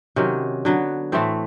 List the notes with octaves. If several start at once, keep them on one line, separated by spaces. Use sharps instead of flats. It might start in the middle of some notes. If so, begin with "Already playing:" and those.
C3 D#3 F#3 C#4
D3 F#3 B3
A2 E3 A3 C4